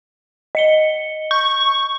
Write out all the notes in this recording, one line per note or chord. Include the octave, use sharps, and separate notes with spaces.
D#5 C#7 G7
C#6 G6